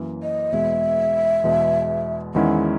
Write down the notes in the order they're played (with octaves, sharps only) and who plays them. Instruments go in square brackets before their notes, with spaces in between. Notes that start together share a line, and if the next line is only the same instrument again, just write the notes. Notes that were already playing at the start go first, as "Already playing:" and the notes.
Already playing: [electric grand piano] F#2 E3 A#3
[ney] D#5
[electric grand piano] E2 B2 G#3 [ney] E5
[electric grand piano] E2 B2 G#3
[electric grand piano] E2 D#3 G#3 C#4 E4 [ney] F#5